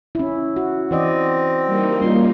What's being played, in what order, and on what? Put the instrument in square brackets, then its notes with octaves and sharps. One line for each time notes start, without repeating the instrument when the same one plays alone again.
[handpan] C#4 E4
F#4
[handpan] E3 D5 D#5 [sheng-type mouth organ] C4
[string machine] G3 A#3 D#4
[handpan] C#4 F4 [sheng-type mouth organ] C6